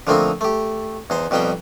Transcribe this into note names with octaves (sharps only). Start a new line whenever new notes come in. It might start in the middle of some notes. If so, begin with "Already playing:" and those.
D3 F3 A3 A#3 C4 D#4
A3 G4
E2 D#4 C5
F2 B2 G3 D#4 G4 G5